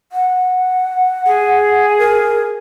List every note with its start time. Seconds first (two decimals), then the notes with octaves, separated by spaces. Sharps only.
0.12 F#5
1.26 G#4
1.98 A#4